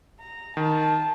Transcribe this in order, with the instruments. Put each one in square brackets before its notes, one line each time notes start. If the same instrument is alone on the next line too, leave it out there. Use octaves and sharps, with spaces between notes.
[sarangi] A#5
[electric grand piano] D#3 [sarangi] A5